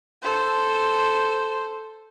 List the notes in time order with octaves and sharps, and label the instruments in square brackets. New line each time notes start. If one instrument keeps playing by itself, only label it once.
[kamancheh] A4 C5